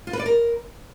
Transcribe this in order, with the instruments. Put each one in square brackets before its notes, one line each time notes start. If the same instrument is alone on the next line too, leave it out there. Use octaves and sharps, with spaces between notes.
[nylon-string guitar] F4
B4
D5
A#4